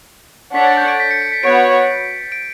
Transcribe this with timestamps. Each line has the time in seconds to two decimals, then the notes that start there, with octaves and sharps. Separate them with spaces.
0.55 D4 A4 C#5 F#5 B6
0.67 A6
0.77 G6
0.88 D7
1.00 B6
1.11 C#7
1.22 C#7
1.32 B6
1.43 B3 F#4 C#5 F#5 D7
2.32 D7